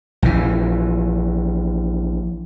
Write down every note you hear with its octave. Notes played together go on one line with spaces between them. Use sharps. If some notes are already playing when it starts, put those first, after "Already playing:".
A#1 E3